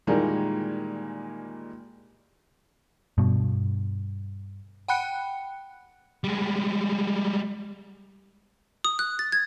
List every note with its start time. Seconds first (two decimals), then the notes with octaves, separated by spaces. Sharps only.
0.07 A#2 D#3 E3 G3 G#3 A#3
3.18 G2 B2
4.88 F#5 G5 B5 F#6 C#7
6.24 G3 G#3
8.84 D#6
8.99 F#6
9.19 A6
9.32 G#6